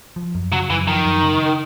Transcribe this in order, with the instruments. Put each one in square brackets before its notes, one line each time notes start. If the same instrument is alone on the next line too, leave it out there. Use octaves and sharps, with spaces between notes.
[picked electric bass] F3
F#2
[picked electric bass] C#3 [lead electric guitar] F#3
[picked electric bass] F#2 [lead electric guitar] E3
[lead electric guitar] D#3 [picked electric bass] F3
[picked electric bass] F#2
C#3